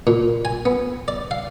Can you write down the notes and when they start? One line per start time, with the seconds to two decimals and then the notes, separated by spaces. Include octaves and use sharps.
0.07 A#2
0.45 G#5
0.65 B3
1.08 D5
1.31 F5